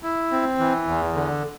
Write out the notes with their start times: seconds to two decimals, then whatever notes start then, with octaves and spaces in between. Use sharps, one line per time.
0.03 E4
0.31 C4
0.59 E3
0.87 E2
1.15 D3